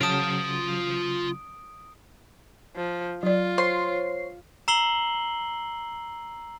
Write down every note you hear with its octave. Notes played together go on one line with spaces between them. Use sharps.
C#3 F#3 F4 A5 D#6 D7
F3
F#3 F4 D5
C5 C#5 C6 C7
A#5 E6 C7 F#7 G7